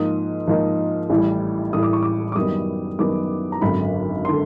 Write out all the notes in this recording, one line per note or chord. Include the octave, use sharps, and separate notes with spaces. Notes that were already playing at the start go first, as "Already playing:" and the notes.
Already playing: G#2 F3 A#3 D#4 D#6
G#2 F3 A#3 D#4
A1 A2 E3 G3
A1 A2 E3 G3 D#6
D6
C#6
D6
D6
F#2 D#3 G3 B3 D#6
F#2 D#3 G3 B3 D6
A#5
G#1 F#2 D3 B5
D3 C6